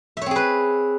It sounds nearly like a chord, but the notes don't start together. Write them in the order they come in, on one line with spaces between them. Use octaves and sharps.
E5 C#5 C4 G#4 B4